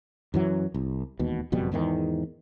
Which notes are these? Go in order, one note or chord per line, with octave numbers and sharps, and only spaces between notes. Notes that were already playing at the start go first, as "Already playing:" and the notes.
F#2 E3 F#3
C2
E1 D#2 B2
F#1 F2 B2 G3
E2 G#2 D3 D#3